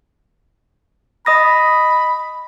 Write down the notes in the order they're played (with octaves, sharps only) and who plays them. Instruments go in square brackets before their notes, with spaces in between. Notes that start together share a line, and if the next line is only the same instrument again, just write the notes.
[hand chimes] D#5 D#6 A#6 [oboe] B5